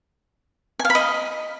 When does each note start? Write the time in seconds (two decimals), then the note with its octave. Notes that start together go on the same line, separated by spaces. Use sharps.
0.79 G#5
0.85 F5
0.90 B5
0.95 D#5